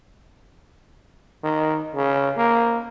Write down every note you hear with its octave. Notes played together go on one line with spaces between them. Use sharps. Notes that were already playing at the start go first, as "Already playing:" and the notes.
D#3
C#3
A#3